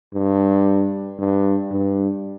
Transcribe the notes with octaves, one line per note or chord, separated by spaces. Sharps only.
G2
G2
G2